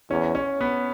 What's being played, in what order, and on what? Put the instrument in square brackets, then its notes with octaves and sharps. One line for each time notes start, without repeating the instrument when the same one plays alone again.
[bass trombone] E2 [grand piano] C#4
[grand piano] C#4
B3